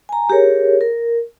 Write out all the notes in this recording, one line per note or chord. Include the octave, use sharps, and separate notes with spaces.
G#5 A#5
G4 G#4 A#4 C#5
A#4